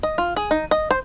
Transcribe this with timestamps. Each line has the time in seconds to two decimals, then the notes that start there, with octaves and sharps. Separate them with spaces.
0.03 D#5
0.18 F4
0.36 G#4
0.51 D#4
0.71 D#5
0.91 C5